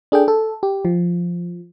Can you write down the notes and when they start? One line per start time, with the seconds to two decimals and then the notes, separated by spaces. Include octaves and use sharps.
0.12 D4 G#4 A4 G5
0.28 A4
0.63 G4
0.85 F3